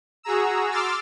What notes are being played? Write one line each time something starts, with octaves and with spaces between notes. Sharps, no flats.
F#4 G#4 A#5 E6
C6 D6 E6 F6 A6